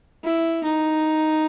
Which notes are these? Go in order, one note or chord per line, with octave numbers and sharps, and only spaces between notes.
E4
D#4